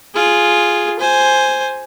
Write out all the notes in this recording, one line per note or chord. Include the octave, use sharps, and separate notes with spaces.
F4 G#4
C5 G#5